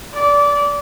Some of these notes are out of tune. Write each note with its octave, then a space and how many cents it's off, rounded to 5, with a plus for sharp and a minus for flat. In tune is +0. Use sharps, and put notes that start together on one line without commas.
D5 -20